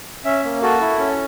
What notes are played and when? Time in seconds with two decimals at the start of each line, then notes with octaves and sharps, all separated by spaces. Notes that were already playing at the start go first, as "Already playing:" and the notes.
0.25 C#4 E5
0.44 A#3
0.62 F#4 A4
0.80 E4
0.99 C#4